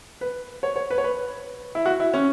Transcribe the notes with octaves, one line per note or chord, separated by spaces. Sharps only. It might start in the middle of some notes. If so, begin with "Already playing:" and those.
B4
C#5
C#5
B4
C#5
B4
E4
F#4
E4
C#4